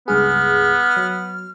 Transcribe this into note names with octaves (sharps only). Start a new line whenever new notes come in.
C#2 G2 B3 G#4 F6
F#3